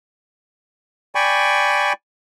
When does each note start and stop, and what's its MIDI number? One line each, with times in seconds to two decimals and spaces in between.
1.15 1.93 74
1.15 1.93 79
1.15 1.93 80
1.15 1.93 83
1.15 1.93 85